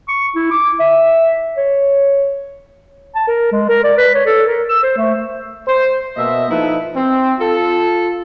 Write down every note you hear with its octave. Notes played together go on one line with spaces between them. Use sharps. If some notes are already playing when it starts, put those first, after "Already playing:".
C#6
E4
D6
E5
C#5
A5
A#4
G#3
A#4
D5
B4
C#5
A4
A#4
E6
C5
A3
C5
B2 A#3 D#5 E5
F3 D#4 E4 A4 B4
C4
F4 A4